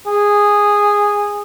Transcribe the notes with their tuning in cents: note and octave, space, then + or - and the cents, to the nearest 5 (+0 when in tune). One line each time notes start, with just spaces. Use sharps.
G#4 -10